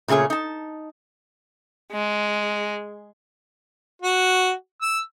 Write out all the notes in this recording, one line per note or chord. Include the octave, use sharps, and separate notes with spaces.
A#2 C#3 A3 G#4 C#5
D#4 A5
G#3
F#4
E6